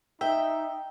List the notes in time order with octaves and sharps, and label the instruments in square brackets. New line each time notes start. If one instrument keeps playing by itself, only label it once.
[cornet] D#4 [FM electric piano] E5 [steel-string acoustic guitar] G5